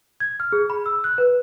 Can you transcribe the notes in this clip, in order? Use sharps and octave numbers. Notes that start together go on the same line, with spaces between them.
G#6
F6
G#4
B5
E6
F#6
B4